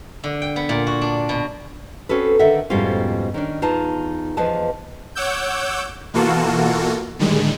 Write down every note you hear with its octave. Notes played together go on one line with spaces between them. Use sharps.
D3
G5
B3
A#2
F#4
D4
B2
C4 C#4 F#4 A4 B4
D3 D#3 A4 E5 F#5
F2 G#2 B2 G3 C#4 F4
D#3 C#4 D4
E2 D#4 F4 A5
E2 F3 B4 D#5 A5
C#5 F#5 D6 E6 G6
B2 E3 A#3 F4 F#4 A4
A2 D3 D#3 G3 G#3